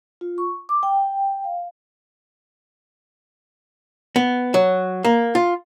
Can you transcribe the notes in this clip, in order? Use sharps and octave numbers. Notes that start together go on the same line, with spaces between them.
F4
C#6
D6
G5
F5
B3
F#3
A#3
F4